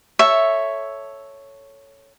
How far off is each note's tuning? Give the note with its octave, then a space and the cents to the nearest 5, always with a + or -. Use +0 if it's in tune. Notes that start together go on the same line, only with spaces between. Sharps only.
A4 +0 C#5 +0 E5 +0